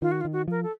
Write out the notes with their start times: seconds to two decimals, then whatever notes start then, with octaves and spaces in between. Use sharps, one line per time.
0.02 D#3 F4
0.12 F#4
0.21 F4
0.25 D#3
0.33 F#4
0.48 F3 A#4
0.63 A4